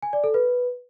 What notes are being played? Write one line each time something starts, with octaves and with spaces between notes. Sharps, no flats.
G#5
D5
A4
B4